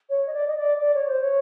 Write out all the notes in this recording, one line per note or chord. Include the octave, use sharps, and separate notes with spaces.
C#5
D#5
D5
D#5
D5
D5
C#5
C5
C#5